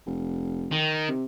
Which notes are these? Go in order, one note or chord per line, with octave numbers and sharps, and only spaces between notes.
F1
D#3
C3